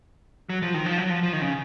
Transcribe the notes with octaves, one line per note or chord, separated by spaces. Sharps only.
F#3
F3
D#3
F3
F#3
F3
F3
D#3
C#3